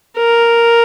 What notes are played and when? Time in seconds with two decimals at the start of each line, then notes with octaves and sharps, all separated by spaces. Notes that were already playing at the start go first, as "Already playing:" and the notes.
0.17 A#4